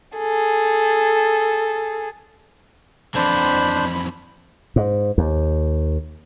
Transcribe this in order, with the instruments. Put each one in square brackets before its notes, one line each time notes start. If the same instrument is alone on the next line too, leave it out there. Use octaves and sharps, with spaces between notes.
[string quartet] G#4 A4
[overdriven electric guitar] F2 E3 [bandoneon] D4 C5 [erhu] B5
[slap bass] G#2
D#2